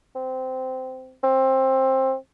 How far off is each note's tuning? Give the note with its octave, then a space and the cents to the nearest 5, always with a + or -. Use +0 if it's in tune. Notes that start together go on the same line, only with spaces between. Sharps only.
C4 -15
C4 +20